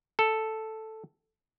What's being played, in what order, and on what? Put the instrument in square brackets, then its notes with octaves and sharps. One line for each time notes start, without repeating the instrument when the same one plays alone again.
[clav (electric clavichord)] A4